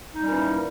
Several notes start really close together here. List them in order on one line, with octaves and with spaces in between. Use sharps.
D#4 G3 C#4 A#2 E3